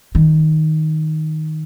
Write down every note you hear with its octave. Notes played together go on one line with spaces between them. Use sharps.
D#3